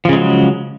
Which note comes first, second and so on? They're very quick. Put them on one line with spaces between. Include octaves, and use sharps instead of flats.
F3 C#3 G#3 F#3